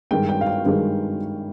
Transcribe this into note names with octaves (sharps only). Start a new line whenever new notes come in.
G2 D#3 G#3 G5
G5
F5
G5
G2 D#3 G#3